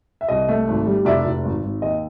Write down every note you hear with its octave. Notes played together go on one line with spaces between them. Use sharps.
E5
C2 D#5
A3
G#1
G3
F1 D5 E5
F1
G#1
G#1
D#2 D#5